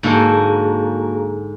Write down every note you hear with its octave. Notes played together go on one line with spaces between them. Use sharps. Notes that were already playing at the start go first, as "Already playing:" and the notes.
G#2 D3 A#3 F#4 G#4 A5 A#5